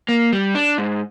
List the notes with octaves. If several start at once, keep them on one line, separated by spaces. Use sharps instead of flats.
A#3
G3
D4
G#2